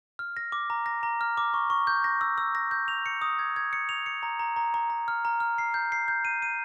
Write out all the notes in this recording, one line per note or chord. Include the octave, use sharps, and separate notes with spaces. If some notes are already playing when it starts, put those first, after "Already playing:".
F6
A#6
D6
A#5
A#6
A#5
F6
D6
C#6
C#6
G6
A#6
E6
E6
A#6
G6
F7
C#7
D#6
G#6
G#6
C#7
F7
C#7
A#5
A#5
A#5
A#5
A#5
F6
A#5
F6
C7
G6
C7
G6
D#7
D#7